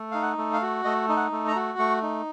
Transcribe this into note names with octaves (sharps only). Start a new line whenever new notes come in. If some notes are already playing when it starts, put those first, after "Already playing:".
Already playing: A3
D#4 F5
F#5
A3
F5
F#4
A3 D#5
D#4
F#5
A3
A#5
F#4
A3 C#6
D#4